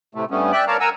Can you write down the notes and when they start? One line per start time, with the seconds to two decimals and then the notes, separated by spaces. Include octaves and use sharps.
0.15 A2 C3 A3
0.31 G2 G3 A3 B3 C#4
0.52 D5 E5 G5 F#6
0.67 A#4 C#5 D5 F5 A5 A#5
0.80 A#4 F#5 G#5 A#5 E6